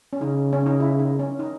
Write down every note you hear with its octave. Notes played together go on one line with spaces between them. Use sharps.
C#4
C#3 D#4
C#4
D#4
E4
D#4
C#4
D#4